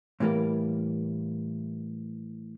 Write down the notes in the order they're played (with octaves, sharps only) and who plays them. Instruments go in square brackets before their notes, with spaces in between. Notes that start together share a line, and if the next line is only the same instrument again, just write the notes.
[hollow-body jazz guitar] A2 E3 G3 A#3